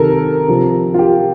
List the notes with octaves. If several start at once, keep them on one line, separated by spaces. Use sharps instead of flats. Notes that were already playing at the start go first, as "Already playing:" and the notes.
Already playing: C3 D#3 A4 A#4
C3 F3
F4
G4